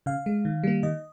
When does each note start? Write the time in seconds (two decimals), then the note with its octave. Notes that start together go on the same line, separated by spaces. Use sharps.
0.06 C#3 F5
0.26 G#3
0.45 D#3
0.64 G3 A#3
0.83 D#3 D#5